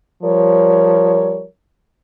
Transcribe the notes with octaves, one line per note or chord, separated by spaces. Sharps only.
F3 G3 A#4 C#5